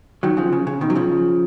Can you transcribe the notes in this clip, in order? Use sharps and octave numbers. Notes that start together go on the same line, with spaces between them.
D#3 F#3
C#3 F3
C#3
C#3
B2 D#3
F#3
C#3 F3